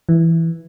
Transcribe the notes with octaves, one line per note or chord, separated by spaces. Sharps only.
E3